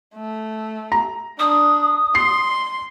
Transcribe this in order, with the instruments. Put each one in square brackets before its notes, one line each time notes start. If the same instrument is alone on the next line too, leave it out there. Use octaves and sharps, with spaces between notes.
[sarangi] A3
[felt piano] A#5
[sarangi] D4 [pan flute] D#6
[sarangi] C6 [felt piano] C7